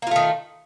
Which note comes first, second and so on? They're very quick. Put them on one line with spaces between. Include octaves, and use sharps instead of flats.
A#3 F4 A3 D#3